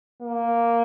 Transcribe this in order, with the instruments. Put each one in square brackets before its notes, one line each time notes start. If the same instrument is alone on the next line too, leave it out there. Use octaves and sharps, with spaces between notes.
[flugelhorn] A#3